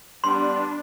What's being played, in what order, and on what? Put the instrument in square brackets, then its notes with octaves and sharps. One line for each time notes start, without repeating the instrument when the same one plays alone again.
[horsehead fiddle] G3 B3 [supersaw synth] D4 [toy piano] C6